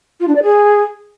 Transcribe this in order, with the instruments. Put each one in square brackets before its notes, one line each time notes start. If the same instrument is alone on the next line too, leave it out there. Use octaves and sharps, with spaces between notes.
[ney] F4
D4
D5
G#4